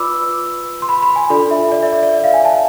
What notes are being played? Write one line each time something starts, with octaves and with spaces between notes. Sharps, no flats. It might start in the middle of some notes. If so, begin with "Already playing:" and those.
Already playing: F4 B4 D5 B5 D6 E6
C6
B5
B5
G#5
D4 F4 A4 D5 B5
E5
D5
E5
D5
D5
E5
F5
G#5
A5